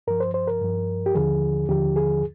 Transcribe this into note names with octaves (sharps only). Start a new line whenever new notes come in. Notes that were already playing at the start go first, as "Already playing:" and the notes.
G2 F3 A#4
C5
C5
A#4
G2 F3
G4
D#2 D3 F3 G#4
D#2 D3 F3 G4
G#4